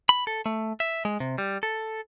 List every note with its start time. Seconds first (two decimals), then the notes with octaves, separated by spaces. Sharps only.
0.09 B5
0.27 A4
0.46 A3
0.80 E5
1.05 G#3
1.20 C3
1.38 G3
1.63 A4